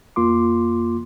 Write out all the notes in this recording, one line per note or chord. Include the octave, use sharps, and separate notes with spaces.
F2 A#3 F4 C6 D6